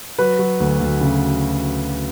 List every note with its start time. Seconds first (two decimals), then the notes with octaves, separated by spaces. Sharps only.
0.19 F#3 B4
0.39 F#3
0.60 D2
0.81 D2
1.01 C#3